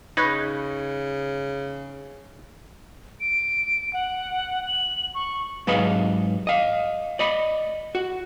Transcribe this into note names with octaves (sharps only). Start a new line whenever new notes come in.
C#3 D#4 B4 C#5 B5
D7
F#5
F#7
C#6
G#2 F#3 B4 D#5 F5
D#5 F5
D5 D#5 B5
F#4